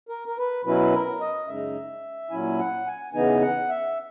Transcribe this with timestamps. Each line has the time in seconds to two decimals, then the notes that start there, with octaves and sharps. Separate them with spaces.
0.09 A#4
0.28 A#4
0.38 B4
0.64 B2 F#3 C#4 E4 B4
0.93 A#4
1.21 D#5
1.47 F#2 C#3 G#3 D#4 E5
2.30 A#2 F#3 C#4 E4 G#5
2.59 F#5
2.87 G#5
3.14 C#3 E3 B3 D#4 G#5
3.41 F#5
3.69 E5